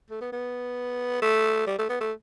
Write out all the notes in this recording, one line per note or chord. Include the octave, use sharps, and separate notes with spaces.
A3
B3
B3
A3
G3
A3
B3
A3